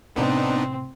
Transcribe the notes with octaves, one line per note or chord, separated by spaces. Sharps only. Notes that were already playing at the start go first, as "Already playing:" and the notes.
A2 C3 B3 C4 D4 D#4